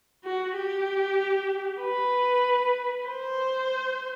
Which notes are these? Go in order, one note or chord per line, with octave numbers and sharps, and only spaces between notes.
F#4
G4
B4
C5